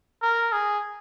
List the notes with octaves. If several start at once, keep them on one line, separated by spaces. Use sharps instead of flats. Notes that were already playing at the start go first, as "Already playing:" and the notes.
A#4
G#4